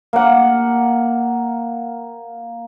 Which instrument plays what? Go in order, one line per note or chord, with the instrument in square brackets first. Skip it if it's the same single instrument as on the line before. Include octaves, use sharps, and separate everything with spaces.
[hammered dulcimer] A#3 F#5